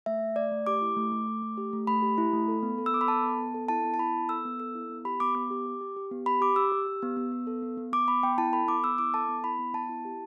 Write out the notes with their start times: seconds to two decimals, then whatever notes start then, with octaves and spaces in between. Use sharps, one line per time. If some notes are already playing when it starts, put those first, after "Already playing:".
0.06 A3 E5
0.21 A3
0.36 A3 D5
0.52 A3
0.66 G4 D6
0.82 E4
0.96 A3
1.12 A3
1.27 A3
1.42 A3
1.57 G4
1.73 A3
1.87 A3 B5
2.02 G4
2.18 E4
2.33 A3
2.48 A4
2.63 B3
2.78 A4
2.86 E6
2.93 B3 D6
3.01 B5
3.08 A4 A5
3.23 B3
3.39 B3
3.54 A4
3.68 E4 A5
3.84 B3
3.94 A5
3.99 E4 B5
4.14 B3
4.29 A4 E6
4.45 B3
4.60 A4 E6
4.75 E4
4.90 B3
5.05 G4 B5
5.20 B3 D6
5.35 B3 D6
5.51 G4
5.66 G4
5.81 G4
5.97 G4
6.11 B3
6.26 G4 B5
6.41 G4 D6
6.56 G4 E6
6.72 G4
6.87 G4
7.02 B3
7.17 B3
7.32 B3
7.47 A4
7.62 B3
7.78 B3
7.93 B3 D6
8.08 B3 B5
8.23 B3 G5
8.38 E4 A5
8.53 A4 B5
8.68 B3 D6
8.84 B3 E6
8.98 E4 D6
9.14 A4 A5
9.29 B3
9.44 E4 B5
9.59 B3
9.74 B3 A5
9.89 E4
10.05 G4